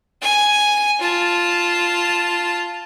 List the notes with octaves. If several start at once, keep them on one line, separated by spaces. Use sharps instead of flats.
G#5
F4 A5